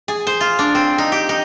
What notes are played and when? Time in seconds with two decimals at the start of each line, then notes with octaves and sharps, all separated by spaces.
0.08 G#4
0.27 C5
0.40 F4
0.59 D4
0.75 C4
0.98 D#4
1.12 G4
1.29 D#4